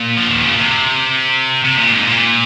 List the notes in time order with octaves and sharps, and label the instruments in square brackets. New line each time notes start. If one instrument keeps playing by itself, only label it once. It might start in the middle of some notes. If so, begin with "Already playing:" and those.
Already playing: [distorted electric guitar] A#2
F3
D#3
C#3
C3
C3
A#2
G#2
A#2